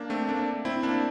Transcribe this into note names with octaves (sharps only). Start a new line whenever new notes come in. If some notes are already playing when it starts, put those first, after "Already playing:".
Already playing: A#3 D4
A3 C4
A#3 D4
C4 E4
A#3 D4